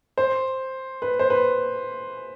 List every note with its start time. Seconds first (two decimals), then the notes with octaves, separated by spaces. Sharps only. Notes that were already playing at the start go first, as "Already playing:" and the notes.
0.17 C5
1.02 B4
1.19 C5
1.30 B4